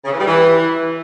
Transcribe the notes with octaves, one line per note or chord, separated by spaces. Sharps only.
C#3
E3
G3
E3